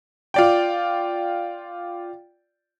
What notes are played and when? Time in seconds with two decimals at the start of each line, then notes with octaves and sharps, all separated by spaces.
0.34 F4 D5 G5